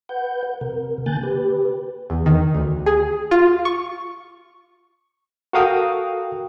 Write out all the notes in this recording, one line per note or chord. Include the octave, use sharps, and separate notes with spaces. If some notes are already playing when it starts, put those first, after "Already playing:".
B4 F#5 G6
C3 A#4
D3 A#3 G#5 F#6 G6 A6
G4 B4
E2
D#3
D2
G#4
F4
C#6
F#4 A4 A#4 F5 G5 D#6